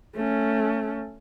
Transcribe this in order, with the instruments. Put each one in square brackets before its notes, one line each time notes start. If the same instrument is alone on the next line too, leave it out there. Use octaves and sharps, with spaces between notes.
[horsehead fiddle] A3 C#4